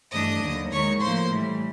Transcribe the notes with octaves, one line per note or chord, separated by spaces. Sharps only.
G2 E3 A3 D4 D#5 D#6
D#2 D3 F#3
D#2 D#3 G#3 C#5 C#6
A2 F3 A#3 C5 C6
A2 E3 G3